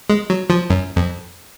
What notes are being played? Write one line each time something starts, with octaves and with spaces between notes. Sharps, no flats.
G#3
F#3
F3
F#2
F2